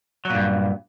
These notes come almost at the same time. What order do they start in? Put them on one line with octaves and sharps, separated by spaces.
F#3 A#2 G2